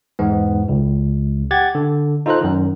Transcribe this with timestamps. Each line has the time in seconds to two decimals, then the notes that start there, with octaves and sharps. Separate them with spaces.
0.19 E2 G#2 B3
0.68 C#2
1.51 G4 F#5 G#6 A6
1.75 D3
2.26 D#4 F4 A4 C5 A#5 F#6
2.41 F#2 D#3